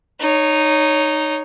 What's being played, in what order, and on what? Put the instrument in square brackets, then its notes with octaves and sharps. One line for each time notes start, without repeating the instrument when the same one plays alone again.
[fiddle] D#4 C#5